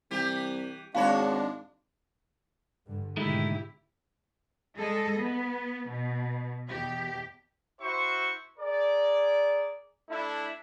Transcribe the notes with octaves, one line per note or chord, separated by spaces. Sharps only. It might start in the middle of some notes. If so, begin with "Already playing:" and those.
C2 E3 G4
G#1 G#3 D4 F#4 C#5 F5 B5
G2 D3
G#2 B2 D3 D#3 G#3 A3 E4 G4
G3 G#3 G#4 A4 D#5
B3
B2
E2 B2 G4
E4 F#4 C5 E5 C#6
G#4 A#4 D5
A3 D4 E4